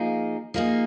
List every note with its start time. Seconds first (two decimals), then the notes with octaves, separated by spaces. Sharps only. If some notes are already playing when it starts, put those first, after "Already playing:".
Already playing: F3 A#3 D#4 G#4
0.54 F3 A#3 D#4 G#4